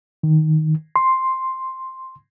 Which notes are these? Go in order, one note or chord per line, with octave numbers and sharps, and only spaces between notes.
D#3
C6